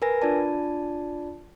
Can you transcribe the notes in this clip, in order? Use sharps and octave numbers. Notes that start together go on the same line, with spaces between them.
A#4 B4 G#5 A#6
D4 F4 D5 A5